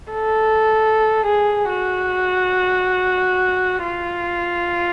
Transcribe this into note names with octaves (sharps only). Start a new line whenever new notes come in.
A4
G#4
F#4
F4